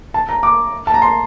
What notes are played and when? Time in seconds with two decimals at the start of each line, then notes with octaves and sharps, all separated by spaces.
0.14 A5
0.29 A#5
0.43 D6
0.87 A5
0.94 A#5
1.02 C6